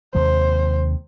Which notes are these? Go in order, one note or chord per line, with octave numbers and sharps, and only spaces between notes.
D#2 C3 G#3 C5